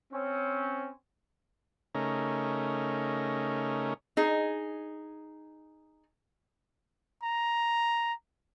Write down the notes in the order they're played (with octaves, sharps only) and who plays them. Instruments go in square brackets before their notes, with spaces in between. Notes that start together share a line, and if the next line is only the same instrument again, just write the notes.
[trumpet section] C4 C#4
[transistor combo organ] C#3 A3 C#4 D#4 A#4
[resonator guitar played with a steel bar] D#4 G#4
[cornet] A#5